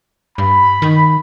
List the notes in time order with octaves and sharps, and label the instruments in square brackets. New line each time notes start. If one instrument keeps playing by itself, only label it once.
[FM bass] G2 [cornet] B5
[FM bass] D#3